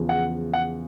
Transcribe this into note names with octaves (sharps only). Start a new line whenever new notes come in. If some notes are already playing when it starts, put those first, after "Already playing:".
Already playing: E2 C#3 F3
F#5
F#5